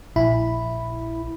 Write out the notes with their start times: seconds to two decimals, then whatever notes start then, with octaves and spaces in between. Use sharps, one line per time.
0.16 A#1 E4 B5